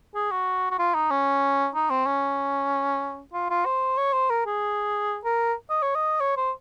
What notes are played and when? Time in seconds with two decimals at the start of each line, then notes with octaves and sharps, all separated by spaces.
0.15 G#4
0.31 F#4
0.71 F#4
0.79 F4
0.95 D#4
1.11 C#4
1.75 D#4
1.90 C4
2.06 C#4
3.33 F4
3.50 F4
3.66 C5
3.98 C#5
4.13 C5
4.30 A#4
4.46 G#4
5.25 A#4
5.70 D#5
5.82 C#5
5.95 D#5
6.21 C#5
6.37 C5